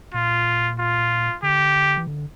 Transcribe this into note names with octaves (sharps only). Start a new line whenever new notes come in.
A#2 F4
F4
D3 G4
E3
D3